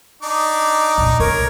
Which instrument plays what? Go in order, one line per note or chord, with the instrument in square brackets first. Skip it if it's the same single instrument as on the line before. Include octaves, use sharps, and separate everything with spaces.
[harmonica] D4 D#4 D6
[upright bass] F2 A#2
[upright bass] C2 [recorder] A#4 [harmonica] C#5